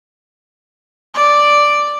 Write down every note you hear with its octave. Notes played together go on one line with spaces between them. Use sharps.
D5